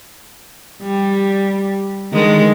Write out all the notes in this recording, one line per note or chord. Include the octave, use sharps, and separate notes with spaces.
G3
D3 D#3 G#3